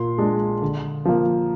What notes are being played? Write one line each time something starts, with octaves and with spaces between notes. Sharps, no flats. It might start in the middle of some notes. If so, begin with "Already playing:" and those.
Already playing: A#2 C6
G#3 D4
D3
F3 A#3